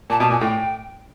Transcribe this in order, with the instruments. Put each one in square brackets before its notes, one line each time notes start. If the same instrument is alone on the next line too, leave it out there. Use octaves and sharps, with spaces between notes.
[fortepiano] A#2 [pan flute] A5
[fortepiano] B2 [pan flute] A5
[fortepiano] A#2 [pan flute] G#5
[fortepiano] A2 [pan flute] G5